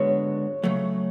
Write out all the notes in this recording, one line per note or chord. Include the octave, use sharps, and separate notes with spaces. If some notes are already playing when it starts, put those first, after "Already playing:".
Already playing: D3 G#3 B3 F#4 C#5
C#3 F#3 A3